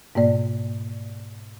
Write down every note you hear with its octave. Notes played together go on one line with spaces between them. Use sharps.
G#2 B2 A#3 D5